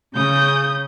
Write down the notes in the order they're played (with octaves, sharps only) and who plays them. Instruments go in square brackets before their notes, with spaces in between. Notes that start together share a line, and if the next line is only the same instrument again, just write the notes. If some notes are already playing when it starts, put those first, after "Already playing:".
[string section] C#3 [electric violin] D#6 G6